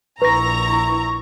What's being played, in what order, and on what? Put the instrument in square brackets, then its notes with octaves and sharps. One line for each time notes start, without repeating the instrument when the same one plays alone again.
[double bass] A#1 E4 [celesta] B4 A#6 [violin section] A#5 [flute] C#6